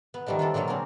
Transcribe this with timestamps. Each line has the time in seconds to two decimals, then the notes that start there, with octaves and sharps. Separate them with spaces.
0.14 B3
0.26 D#3 F3 G3 A3 D#4
0.39 D4 F4 A4 D5
0.54 A#2 D3 F3 F#3 A#3
0.68 C4 D4 G#4 A#4